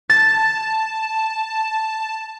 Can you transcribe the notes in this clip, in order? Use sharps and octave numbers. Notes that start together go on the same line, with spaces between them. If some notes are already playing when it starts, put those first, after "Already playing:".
A5 A6